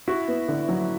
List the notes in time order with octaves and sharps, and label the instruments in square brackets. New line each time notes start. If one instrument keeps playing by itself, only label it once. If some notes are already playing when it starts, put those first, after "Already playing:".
[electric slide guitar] E4 [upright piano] F#4
[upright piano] B3
D3
F#3